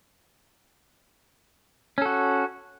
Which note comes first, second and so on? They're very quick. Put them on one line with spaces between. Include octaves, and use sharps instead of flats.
C#4 A4 F#4